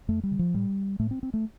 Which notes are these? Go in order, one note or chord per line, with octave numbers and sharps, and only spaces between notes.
F2 A3
G3
D3
F3
A2 G3
A2 A3
C4
C4
A3